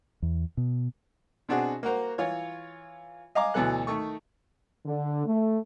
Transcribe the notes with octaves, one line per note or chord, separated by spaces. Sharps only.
E2
B2
B2 C4 D4 F#4 G#4
A#3 F#4 A#4 C5
E3 F4 C#5
D#5 F5 G#5 A#5 D6
D2 B2 E3 F#3 A4 F#6
D#3 A3 C#6
D3
A3